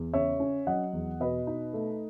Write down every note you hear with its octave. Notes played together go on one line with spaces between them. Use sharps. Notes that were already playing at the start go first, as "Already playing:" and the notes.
Already playing: E2
C#3 C#5 E5
C#4
F#3 D#5 F#5
E2
B2 B4 D#5
D#4
A3